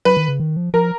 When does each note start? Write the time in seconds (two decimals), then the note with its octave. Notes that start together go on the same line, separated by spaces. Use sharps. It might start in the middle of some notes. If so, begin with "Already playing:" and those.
0.05 F#3 B4
0.17 D#3
0.28 C#3
0.40 D#3
0.57 F3
0.73 F3 A#4